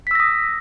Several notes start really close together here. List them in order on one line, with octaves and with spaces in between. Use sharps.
B6 E6 A#6 D#6